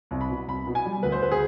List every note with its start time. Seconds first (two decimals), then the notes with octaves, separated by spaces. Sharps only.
0.11 C2
0.21 B5
0.30 B2
0.48 C2 B5
0.67 B2
0.75 G#5
0.85 G3
1.03 D2 B4
1.12 C5
1.21 D2 B4
1.31 G#4